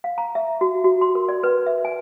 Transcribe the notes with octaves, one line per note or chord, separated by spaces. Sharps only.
F5
A#5
E5
F#4
F#4
C6
A#4
D5
B4
E5
G#5